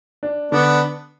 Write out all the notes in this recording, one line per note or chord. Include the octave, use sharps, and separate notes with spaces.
D4
D3 B3 D4